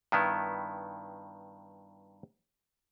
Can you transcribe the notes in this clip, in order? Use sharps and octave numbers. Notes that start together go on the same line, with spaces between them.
G2 D#3 B3 E4